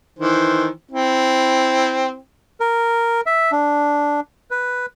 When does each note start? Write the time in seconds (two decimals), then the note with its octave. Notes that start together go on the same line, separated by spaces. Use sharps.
0.19 D#3 E3 C5
0.91 C4 E4
2.60 A#4
3.26 E5
3.52 D4
4.51 B4